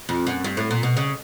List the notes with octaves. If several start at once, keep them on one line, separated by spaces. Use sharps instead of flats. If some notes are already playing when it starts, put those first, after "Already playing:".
F2
F#2
G2
A2
A#2
B2
C#3